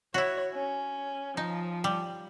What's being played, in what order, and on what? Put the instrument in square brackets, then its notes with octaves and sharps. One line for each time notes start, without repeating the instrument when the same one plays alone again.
[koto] E4 F#4 [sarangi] C#5
[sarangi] C#4
[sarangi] F3 [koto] D#4
[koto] G3